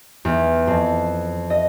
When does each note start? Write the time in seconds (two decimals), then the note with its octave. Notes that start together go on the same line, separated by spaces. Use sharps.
0.25 E2
0.67 F2
1.50 D#5